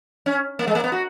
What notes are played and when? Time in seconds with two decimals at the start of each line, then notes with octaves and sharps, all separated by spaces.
0.26 C#4
0.59 A#3
0.67 G#3
0.75 A#3
0.84 B3
0.92 F#4